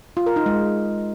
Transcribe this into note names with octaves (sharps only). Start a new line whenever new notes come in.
F4
A#4
D#4
G#3